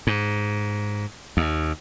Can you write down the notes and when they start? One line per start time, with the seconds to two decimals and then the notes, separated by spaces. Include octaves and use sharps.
0.07 G#2
1.37 D#2